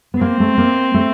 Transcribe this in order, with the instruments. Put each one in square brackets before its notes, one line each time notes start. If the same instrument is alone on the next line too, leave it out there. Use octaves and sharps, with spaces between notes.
[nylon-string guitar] B3
[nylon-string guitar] A#3 [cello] C4
[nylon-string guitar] A3
A#3
A3